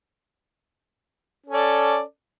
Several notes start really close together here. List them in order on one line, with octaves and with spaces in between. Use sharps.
C#4 A4 D5